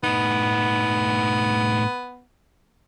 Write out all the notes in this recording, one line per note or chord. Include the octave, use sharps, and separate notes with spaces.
A2 B3 D#4